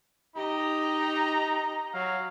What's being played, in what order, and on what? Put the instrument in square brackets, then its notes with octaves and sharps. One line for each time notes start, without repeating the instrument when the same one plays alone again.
[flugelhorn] D#4 [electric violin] G4 D#5 [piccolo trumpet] A#5
[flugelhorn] F#3 [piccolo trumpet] F5